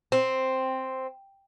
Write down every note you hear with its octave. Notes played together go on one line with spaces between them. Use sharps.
C4